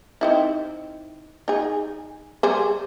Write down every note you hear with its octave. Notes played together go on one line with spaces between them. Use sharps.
C4 D#4 E4
D#4 G#4
G3 G#4 C5